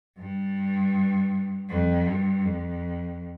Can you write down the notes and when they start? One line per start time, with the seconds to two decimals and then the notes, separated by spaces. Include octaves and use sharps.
0.18 G2
1.69 F2
2.07 G2
2.45 F2